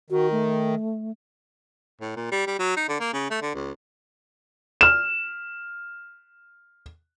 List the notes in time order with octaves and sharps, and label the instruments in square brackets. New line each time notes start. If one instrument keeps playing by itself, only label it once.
[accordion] D#3 [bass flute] F#4
[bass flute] A3
[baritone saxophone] A2
A#2
G3
G3
F#3
D#4
D3
A#3
C#3
A3
D3
C#2
[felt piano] F6 E7